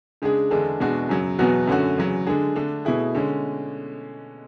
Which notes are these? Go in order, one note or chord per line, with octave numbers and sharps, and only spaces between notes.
C#3 G#3 D4 G#4
E2 D3 G#3 D4 A4
E2 B2 G#3 D4 F#4
F#2 C#3 F#3
E2 B2 F#3 B3 F#4
F#2 D3 A3 C#4 F#4
E2 C#3 F#3
D3 G#3 D4 G#4
D3 A3 D4
B2 A3 E4 G#4
D3 G#3 C#4